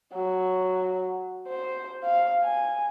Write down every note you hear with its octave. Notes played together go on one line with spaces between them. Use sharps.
F#3
C5
F5
G#5